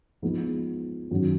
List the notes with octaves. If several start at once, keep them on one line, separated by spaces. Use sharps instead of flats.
F3 G#3 B3 D#4
F#2 D#3 F#3 C#4 F#4